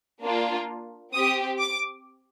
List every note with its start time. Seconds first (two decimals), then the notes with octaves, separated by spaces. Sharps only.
0.23 A#3 D4 F4
1.13 C4 G4 D#6
1.59 D6